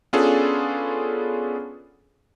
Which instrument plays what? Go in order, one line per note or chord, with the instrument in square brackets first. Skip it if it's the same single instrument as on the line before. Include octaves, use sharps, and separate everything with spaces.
[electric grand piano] B3 C#4 D4 F4 G#4 A4